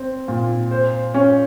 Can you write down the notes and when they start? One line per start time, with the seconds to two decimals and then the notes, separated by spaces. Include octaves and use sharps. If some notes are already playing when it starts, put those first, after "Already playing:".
Already playing: C4
0.28 A#2
0.71 C5
1.14 C#4